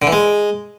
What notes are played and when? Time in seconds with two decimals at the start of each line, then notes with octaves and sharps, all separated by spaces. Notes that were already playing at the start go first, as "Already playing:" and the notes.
0.02 D3
0.07 E3
0.12 G#3